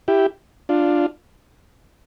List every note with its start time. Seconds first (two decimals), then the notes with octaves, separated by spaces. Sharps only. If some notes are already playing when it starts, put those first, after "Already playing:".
0.08 E4 G4
0.69 D4 F4